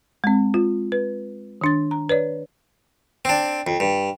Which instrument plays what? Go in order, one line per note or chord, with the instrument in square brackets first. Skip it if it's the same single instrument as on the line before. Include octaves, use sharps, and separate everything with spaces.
[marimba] G#3 C4
F4
B4
D#3 D4 A6
A#5
B4 C#5 D5
[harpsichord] C4 D4
F2
G2